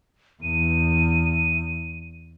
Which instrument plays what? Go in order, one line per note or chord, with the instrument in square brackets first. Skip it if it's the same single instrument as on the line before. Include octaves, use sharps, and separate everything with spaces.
[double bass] E2 [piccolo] D#7